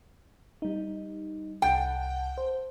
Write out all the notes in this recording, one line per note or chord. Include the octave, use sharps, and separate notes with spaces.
G3 D#4
C2 F#5 G5 A5
C5